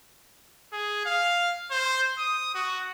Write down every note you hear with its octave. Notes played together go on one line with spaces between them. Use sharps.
G#4
F5
C5
D#6
F#4